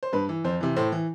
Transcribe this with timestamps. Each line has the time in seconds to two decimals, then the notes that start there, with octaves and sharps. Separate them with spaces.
0.03 C5
0.13 G2 B4
0.29 E3
0.44 F2 C5
0.60 C3 E3
0.76 A2 C5
0.92 E3